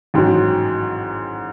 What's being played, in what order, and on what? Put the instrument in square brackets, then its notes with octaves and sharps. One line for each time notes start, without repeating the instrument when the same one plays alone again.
[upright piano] A1 G#2 D#3 F#3